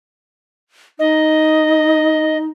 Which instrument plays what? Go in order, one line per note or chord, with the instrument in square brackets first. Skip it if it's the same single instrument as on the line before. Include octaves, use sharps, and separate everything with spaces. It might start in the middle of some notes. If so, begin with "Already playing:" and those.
[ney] D#4 [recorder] D#5